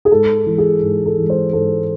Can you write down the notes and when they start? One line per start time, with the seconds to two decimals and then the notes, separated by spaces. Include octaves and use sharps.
0.05 G#4
0.12 G#2 A4
0.46 E3 G#3
0.58 G#4
0.82 G#2
1.06 A4
1.17 E3 G#3
1.30 C5
1.53 G#2 A4